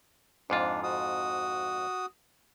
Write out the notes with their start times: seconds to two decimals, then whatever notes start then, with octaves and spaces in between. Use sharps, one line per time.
0.50 F2 G#2 D4 F4
0.83 F#4 D#6